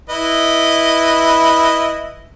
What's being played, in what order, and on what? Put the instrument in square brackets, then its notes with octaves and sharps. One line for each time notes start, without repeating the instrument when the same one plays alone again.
[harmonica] E4 B4 D#5